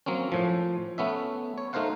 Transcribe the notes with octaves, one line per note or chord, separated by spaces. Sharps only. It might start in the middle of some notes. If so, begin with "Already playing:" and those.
F#3 A#3 C4 C#4
A2 F3
A3 B3 C#4 E5
C#5
A3 D#4 A#4 C5 F5 F#5